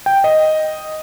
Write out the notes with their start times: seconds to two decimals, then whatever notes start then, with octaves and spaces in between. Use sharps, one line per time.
0.06 G5
0.24 D#5